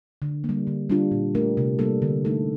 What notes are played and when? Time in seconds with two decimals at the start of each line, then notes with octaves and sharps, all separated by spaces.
0.22 D3
0.44 A#3
0.49 G3
0.67 D3
0.90 G3 D4 F4
1.11 A#2
1.35 A3 D4 G4 A#4
1.57 C3
1.79 G3 A#3 D4 A4
2.02 D3
2.25 A3 D#4 A4